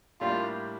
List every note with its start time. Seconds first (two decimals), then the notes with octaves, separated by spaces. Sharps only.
0.21 A2 G3 A#3 D4 F4 G4